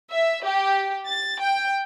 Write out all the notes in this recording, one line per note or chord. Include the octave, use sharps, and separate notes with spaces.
E5
G4
A6
G5